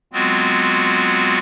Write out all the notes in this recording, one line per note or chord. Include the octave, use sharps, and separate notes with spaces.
F#3 G#3 B3 C4 F4 F#4